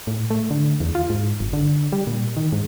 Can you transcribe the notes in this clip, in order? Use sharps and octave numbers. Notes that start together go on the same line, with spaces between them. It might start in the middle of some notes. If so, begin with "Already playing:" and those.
A2
A3
D3
E2
F4
G#2
G1
D3
G3
A#2
D#3
G#2